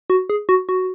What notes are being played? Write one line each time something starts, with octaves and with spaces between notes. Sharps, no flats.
F#4
G#4
F#4
F#4